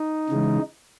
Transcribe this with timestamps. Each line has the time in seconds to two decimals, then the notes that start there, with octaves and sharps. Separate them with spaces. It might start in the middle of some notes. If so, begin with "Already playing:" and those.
Already playing: D#4
0.29 C#3 E3 G#3